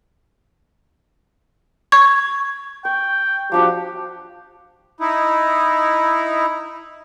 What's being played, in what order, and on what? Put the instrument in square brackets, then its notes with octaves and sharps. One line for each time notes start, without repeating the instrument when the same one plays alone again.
[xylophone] C#6 G#6
[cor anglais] G5 [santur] C#6
[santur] F3 D4 F#4 [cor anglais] G4
[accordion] D#4 E4